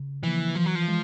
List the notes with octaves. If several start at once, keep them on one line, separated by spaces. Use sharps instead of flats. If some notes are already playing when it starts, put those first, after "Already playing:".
Already playing: C#3
E3 F3 A#3
E3 F3
F#3
F3
G#3